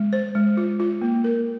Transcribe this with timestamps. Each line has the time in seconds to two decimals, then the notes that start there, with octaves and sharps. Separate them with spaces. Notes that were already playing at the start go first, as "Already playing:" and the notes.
Already playing: G#3
0.13 C5
0.35 G#3
0.57 F4
0.80 F4
1.02 A#3
1.24 A#4